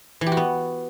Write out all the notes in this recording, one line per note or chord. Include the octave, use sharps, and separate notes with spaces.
E3
G4
F#4
B3